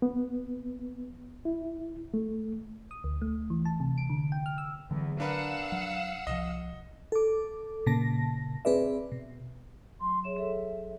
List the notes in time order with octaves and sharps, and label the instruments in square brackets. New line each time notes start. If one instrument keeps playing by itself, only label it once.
[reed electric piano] B3
E4
A3
[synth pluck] D#6
D2
A3
E3
A5
C3
D7
D3
G5
F6
E6
[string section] E2 [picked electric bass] D3 F#3
[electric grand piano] D4 A#4 B4 [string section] F5 F#5 E6
[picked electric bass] F#3
[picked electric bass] C2 B2 F3 [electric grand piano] D#5
[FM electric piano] A4 D6
A#2 C#3 A5 A#6
C4 G#4 B4 D5 E5
B2
[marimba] F#3 [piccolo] C6
[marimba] G#4 C#5 E5 [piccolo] E7
[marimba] A4 C#5 [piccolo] E5